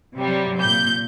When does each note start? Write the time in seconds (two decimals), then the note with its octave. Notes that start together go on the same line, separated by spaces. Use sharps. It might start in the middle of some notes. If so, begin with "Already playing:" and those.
0.16 C3 F#3 G3
0.61 A#2 G6